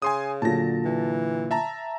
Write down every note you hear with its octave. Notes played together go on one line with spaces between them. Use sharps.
C#3 G#5 C6 D#6
A#2 D3 F#3 A5 A#6
E3
E5 A5 A#5